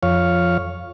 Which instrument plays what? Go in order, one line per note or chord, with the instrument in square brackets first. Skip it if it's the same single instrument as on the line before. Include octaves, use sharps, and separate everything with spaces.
[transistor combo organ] F2 C#5 F5